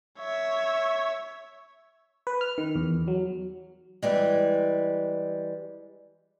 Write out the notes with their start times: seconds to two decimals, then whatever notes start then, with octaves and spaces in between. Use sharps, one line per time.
0.19 C#5 E5
2.27 B4
2.41 F6
2.58 D#3
2.75 E2
3.08 F#3
4.03 E3 G3 G#3